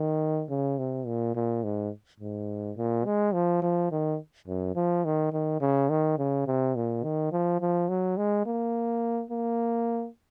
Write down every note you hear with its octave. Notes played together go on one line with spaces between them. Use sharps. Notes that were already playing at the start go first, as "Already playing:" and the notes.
Already playing: D#3
C#3
C3
A#2
A#2
G#2
G#2
A#2
G#3
F3
F3
D#3
F#2
F3
D#3
D#3
C#3
D#3
C#3
C3
A#2
D#3
F3
F3
F#3
G#3
A#3
A#3